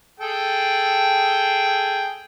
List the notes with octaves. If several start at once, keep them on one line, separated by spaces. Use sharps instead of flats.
G#4 A4 G5